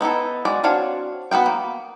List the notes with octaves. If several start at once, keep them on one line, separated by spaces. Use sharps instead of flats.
B3 D#4 E4 A4
G#3 F#4 D5
C4 D4 F#4 C#5 F5
B3 F#4 F5 G5
A#3